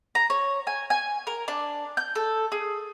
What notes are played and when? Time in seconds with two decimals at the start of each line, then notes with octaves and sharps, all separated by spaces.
0.15 A#5
0.30 C#5
0.67 G#5
0.90 G#5
1.27 A#4
1.48 D4
1.97 G6
2.15 A4
2.52 G#4